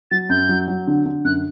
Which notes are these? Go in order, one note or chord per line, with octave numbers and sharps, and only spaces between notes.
F#3 A6
F#2 G6
F#3
F#3
D3
D3
F#2 F#6